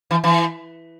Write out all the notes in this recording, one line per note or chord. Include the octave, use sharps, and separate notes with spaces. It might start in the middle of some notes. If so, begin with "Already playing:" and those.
E3
E3